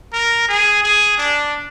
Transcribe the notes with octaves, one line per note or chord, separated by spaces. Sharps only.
A#4
G#4
G#4
D4